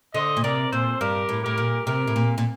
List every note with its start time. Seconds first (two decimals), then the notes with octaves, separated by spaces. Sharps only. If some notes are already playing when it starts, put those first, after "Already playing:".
0.14 D3 C5 D#5
0.37 A#2
0.43 C3 A#4 D5
0.72 A#2 A4 C5
1.01 G2 G4 A#4
1.29 A2
1.43 A2 G4 A#4
1.58 A#2
1.86 C3 G4 A#4
2.07 A2
2.16 A#2
2.38 A#2